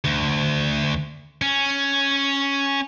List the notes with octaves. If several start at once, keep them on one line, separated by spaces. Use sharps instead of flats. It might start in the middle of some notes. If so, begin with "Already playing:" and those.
D2
C#4